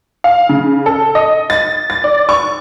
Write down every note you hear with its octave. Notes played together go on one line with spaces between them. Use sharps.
F5
C#3
A4
D#5
A6
A6
D5
C#6